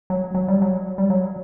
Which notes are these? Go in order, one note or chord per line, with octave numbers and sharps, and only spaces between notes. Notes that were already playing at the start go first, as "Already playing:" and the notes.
F#3
F#3
G3
F#3
G3
F#3